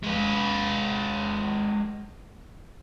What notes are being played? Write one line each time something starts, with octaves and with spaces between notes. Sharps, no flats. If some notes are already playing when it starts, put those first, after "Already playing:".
G#3 B4